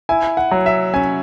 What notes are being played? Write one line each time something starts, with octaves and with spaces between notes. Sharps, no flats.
E4 G#5
F#5
F#3
E5
C#4 G#5